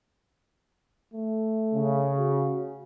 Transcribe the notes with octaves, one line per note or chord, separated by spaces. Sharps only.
A3
C#3
F#4